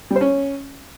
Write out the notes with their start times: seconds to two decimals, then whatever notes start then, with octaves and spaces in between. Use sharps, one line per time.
0.11 G3
0.16 C5
0.21 C#4